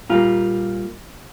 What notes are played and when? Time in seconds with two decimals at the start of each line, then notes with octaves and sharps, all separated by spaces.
0.10 A#2 G3 A#3 F4